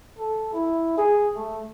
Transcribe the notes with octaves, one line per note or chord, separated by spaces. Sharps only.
A4
E4
G#4
A3